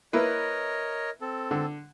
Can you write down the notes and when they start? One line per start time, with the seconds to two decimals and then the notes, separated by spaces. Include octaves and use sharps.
0.13 A#3 E4 A#4 B4 C#5 D#5
1.21 C4 A4
1.51 D3